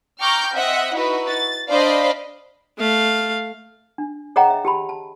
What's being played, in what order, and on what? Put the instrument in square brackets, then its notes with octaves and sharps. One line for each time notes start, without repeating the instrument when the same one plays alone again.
[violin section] G5 A#5 C#6 D6 F6 G6
C4 D#5 E5 F#5
D#4 E4 F#4 B4
A6
D4 C5 D5 D#5 F5 B5
[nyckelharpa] A3 F5
[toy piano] D4
G#4 C#5 D#5 F#5 G5 A#5
E5
G4 A5 B5
A5